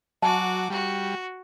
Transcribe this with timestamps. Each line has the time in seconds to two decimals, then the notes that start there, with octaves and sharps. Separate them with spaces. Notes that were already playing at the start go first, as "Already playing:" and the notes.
0.22 F#3 F#4 D#5 G#5 A5 D6
0.70 G3 F#4